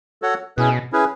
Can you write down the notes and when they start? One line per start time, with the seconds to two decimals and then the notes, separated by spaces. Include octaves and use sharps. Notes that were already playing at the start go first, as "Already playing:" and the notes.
0.22 F#4 A4 C#5 F#5
0.57 B2 C#4 E4 G#4 B4
0.92 C#4 E4 G#4 B4